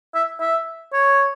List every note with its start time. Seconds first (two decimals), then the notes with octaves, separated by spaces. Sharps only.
0.15 E5
0.41 E5
0.93 C#5